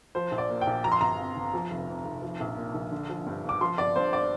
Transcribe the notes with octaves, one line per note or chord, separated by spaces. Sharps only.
F3 C5
A#1
D5
A#2
G5
A#1
F3 A#5
C6
G1 A#5
F2
G1
F3
F1
F2
F1
F3
A#1
A#2
A#1
D3
F3
G2
G1
D6
F3 C6
G1 D5
G2 C5
D5